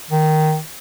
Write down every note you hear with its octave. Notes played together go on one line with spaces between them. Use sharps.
D#3